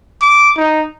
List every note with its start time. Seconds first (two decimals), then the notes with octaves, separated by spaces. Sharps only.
0.22 D6
0.57 D#4